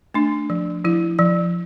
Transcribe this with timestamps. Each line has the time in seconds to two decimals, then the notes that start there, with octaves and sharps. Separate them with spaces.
0.14 A3 D4
0.50 F3
0.85 F3 E4
1.19 F3